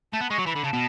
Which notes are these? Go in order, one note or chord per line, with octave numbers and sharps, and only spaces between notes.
A3 A5
B3
G#3 C#6
F#3
E3 B5
D3
C#3 A5
B2